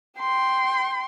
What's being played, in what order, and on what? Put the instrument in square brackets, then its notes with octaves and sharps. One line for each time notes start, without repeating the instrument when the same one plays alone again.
[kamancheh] G5 C6